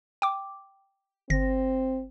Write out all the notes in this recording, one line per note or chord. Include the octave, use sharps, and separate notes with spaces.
G5 D6
G1 C4 A#6